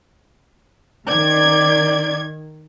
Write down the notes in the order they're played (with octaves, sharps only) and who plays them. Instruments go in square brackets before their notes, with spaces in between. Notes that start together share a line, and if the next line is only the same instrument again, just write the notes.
[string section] D#3 G#6 [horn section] D5